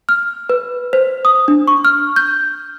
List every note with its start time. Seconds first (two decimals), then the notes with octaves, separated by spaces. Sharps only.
0.09 F6
0.49 B4
0.93 C5
1.25 D#6
1.48 D4
1.68 C#6
1.85 F6
2.16 G6